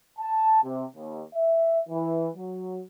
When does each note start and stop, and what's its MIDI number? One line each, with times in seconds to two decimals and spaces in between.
0.19 0.60 81
0.64 0.86 48
0.96 1.23 39
1.34 1.81 76
1.89 2.29 52
2.36 2.82 54